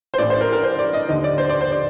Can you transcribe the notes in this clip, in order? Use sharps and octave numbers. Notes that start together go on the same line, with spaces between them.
C5
A1 A2 D5
C5
A#4
A#4
C5
D5
D#5
D#2 D3 D#5
D5
C5
D5
C5
D5